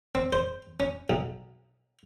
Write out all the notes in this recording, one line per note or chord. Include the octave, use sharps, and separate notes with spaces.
C4
C5
C#4
B1